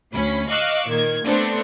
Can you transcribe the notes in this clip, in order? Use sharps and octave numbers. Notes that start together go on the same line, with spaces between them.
D2 C#4 B5
D#5 F5 C#6 D6 E6 F#6
A#2 D#3 G#6
A3 B3 C4 D4